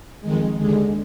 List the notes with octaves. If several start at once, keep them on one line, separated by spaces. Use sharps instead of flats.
F2 D#3 G#3
D#2 D3 G#3